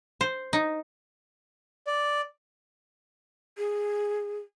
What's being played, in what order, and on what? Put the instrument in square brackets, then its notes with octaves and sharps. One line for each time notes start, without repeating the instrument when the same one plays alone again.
[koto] C5
D#4
[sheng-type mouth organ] D5
[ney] G#4